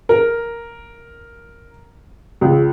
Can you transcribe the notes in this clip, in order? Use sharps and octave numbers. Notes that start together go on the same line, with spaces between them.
A#4
C#2